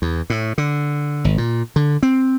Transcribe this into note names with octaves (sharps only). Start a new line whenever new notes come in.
E2
A2
D3
G#1
A#2
D3
C4